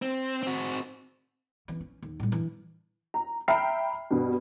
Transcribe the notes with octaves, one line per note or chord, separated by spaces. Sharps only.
C4
C4 F#4
E3 C#4
C#4
D#2
A2 G3
E3 D4
A#5
E5 G5 A#5 B5 F6 C7
G2 B2